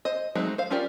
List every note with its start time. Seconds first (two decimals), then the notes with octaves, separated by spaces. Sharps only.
0.05 C5 D#5
0.35 F#3 G#3 A3 C4 D#4
0.58 C5 F5
0.70 C#4 F4 G4 A#4 D5